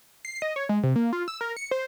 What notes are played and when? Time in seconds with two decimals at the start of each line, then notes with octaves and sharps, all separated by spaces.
0.25 C7
0.42 D#5
0.56 C#5
0.69 G#3
0.83 C3
0.96 A#3
1.13 F4
1.28 E6
1.41 A#4
1.57 C#7
1.71 C5